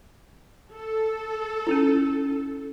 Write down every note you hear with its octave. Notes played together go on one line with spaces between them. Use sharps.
A4
C#4 D#4 E4